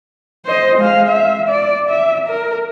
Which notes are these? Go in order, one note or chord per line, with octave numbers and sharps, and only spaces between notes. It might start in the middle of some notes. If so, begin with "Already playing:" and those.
C5 D#5
G#3 F5
E5
D5
E5
A#4